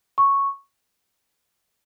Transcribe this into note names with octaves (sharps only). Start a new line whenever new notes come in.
C#6